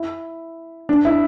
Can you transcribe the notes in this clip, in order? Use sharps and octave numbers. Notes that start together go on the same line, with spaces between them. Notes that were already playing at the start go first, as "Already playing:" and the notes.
Already playing: E4
D4
E4